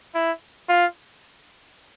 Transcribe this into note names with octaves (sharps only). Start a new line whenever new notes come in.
E4
F4